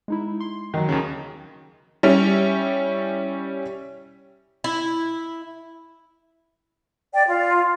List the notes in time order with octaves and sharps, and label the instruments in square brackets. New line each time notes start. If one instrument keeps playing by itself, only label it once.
[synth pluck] G#3 D#4 E4
C6
[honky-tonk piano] D#3 F#3
[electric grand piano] D#2 C#3
[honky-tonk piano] G3 C#4 E4
[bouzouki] E4
[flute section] D5 G5
F4